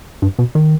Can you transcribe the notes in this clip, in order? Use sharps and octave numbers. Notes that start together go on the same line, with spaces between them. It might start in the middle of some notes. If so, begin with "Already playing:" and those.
G2
B2
D#3